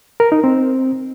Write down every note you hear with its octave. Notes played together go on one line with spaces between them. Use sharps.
A#4
D#4
C4